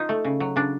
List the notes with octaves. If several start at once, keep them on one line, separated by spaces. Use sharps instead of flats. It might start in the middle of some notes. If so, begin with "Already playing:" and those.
Already playing: F3 D#4
A3
C#3
F#3
C#3 D4